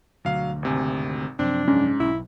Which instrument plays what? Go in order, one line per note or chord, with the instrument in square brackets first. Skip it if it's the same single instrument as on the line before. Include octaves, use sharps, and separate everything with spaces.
[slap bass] D2 B2 D3 [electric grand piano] F#3 F5
[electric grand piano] G#1 C3 G#5
[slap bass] F#2 C3 F3 [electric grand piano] C4 [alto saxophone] D4
[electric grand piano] G#2 [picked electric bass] C#4
[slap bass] B1 [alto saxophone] E4